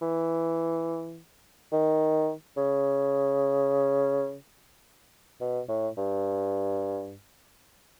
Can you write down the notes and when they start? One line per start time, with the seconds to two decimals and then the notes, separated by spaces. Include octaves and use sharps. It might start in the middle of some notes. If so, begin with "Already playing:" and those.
0.02 E3
1.72 D#3
2.57 C#3
5.41 B2
5.69 A2
5.97 G2